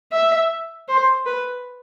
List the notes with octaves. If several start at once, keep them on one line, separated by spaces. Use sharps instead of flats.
E5
C5
B4